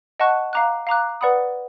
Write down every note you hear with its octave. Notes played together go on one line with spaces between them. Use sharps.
D#5 F#5 A5 C#6 F#6
F5 A#5 D6 F#6
F5 A#5 D6 F#6
B4 D5 F#5 B5 D#6